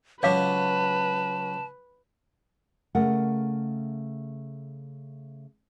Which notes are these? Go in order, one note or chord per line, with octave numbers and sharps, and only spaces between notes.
C#2 F#3 B4 C#5 F5 A5 D6
C#3 A3 A#4 F#5